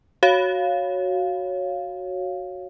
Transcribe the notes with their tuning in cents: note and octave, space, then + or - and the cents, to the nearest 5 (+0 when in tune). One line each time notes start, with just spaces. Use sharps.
F#4 +0 C#5 +0 F5 +0